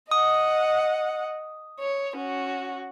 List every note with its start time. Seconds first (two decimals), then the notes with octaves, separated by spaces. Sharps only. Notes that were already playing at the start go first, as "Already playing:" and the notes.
0.11 D#5 F#5 D#6
1.79 C#5
2.16 C#4 F#4